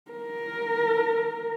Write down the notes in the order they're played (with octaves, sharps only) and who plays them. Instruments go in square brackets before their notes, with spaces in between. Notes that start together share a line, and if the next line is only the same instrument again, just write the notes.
[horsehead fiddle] A#4